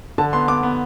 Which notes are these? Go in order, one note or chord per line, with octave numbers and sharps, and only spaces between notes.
D3 A5
B3 C6
B3 D6
B3